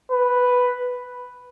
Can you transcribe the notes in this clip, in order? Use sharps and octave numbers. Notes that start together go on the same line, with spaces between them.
B4